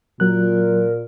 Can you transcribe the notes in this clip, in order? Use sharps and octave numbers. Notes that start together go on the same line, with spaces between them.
A#2 F#3 A#4 F#6